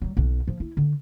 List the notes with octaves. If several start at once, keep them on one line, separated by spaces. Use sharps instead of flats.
F#3 G3
B1 B2
F3
E4
D3